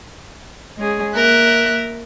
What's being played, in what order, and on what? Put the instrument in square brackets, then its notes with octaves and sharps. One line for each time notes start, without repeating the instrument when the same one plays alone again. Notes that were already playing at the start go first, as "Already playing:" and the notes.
[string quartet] G#3 C#4 G#4
[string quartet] A#3 E5 F#6 [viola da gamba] A#4